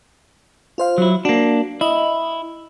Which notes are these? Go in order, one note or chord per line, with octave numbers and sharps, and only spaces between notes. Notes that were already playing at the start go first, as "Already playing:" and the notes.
F4 C5 F5
F#3 E4
A#3 D4 F#4
E4 D#5